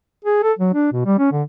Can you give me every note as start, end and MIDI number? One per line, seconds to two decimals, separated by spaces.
0.25 0.39 68
0.43 0.53 69
0.59 0.73 54
0.74 0.88 62
0.93 1.04 47
1.05 1.16 55
1.19 1.31 61
1.32 1.43 50